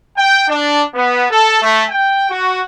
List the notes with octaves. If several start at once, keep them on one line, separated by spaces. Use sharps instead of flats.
G5
D4
B3
A4
A3
G5
F#4